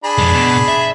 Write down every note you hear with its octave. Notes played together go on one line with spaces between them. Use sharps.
D4 G#4 B5
F2 G#3
B2
E5